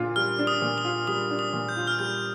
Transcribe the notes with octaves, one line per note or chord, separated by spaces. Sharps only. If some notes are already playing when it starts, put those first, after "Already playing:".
Already playing: A#2 D4 F4
G3 F6
D4
D#6
A#2
D#6
F4
G3 D#6
D4
D#6
A#2
G6
F4
F6
G3 G6